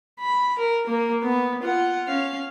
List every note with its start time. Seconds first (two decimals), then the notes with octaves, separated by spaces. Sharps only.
0.20 B5
0.58 A#4
0.87 A#3
1.23 B3
1.62 F4 F#5
2.07 C#4 F5